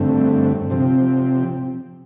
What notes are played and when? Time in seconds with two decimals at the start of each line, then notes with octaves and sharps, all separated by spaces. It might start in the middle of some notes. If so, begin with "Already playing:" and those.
Already playing: G2 D3 A3 C4
0.70 C3 F3 C4